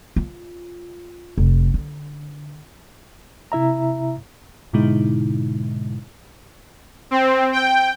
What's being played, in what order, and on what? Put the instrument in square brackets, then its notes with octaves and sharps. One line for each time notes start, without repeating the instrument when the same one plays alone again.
[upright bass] F4
F1
D3
[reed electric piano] C3 E4 E5 A#5
[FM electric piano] G#2 B2 D3 G#3 D#4 E4
[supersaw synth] C4
G5